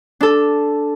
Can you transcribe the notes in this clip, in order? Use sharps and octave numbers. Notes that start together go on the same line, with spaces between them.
D4 A4